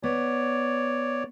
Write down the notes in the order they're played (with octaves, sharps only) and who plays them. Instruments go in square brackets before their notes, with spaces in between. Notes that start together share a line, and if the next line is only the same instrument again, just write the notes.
[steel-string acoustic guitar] B3 [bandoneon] C#5 D5